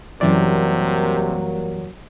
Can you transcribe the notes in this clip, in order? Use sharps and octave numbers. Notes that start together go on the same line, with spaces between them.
F#2 C3 E3 F#3 G3 A#3 A#4 D5